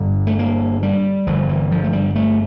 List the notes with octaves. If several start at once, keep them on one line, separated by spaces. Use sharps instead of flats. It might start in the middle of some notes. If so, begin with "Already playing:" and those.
Already playing: G1 G2 D3
A3
A#3
G3
G1 G2 D3 F3
E3
F3
A3
G3
A3